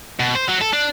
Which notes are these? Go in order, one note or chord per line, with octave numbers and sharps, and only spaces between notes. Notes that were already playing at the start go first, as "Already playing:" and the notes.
B2
C5
F#3
A4
D4